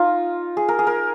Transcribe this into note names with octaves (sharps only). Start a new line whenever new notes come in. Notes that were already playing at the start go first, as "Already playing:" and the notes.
Already playing: D#4 F4
G#4
A#4
G#4
A#4